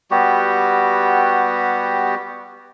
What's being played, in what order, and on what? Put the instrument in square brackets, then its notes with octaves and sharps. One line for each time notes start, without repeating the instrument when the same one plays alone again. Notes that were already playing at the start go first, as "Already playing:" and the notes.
[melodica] G3 B3 F#4 G4